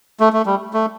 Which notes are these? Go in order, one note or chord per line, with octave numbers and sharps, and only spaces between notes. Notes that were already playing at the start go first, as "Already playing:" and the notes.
A3
A3
G3
A3